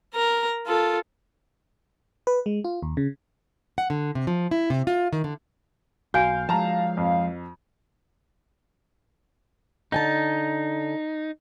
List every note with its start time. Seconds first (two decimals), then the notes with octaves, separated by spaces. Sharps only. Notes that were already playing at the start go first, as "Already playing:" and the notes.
0.14 A#4 A#5
0.66 F4 A4
2.27 B4
2.46 G#3
2.64 F4
2.83 D#2
2.97 C#3
3.78 F#5
3.90 D3
4.15 C3
4.27 F3
4.51 E4
4.70 C3
4.87 F4
5.13 D#3
5.24 D3
6.14 B1 F#4 F5 G#5 G6
6.49 F3 G#3 A5 A#5
6.97 F2
9.92 D3 D#4 G#5 A5